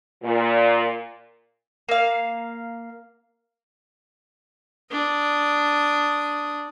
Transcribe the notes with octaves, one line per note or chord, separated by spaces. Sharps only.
A#2
A#3 F5
D4 D#6